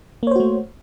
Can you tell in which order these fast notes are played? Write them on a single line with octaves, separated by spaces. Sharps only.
A#3 C#5 C5 F#4 A3